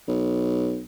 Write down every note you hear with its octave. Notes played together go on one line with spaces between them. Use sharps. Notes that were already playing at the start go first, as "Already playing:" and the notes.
B1